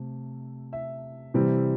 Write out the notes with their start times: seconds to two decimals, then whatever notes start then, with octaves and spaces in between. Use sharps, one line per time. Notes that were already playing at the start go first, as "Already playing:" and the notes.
Already playing: C3 A3
0.73 E5
1.34 C3 E3 G3 C4